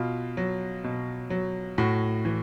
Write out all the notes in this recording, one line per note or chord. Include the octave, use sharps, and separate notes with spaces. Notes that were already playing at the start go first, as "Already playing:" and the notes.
Already playing: B2 F4
F#3
B2
F#3
A2 F#4
E3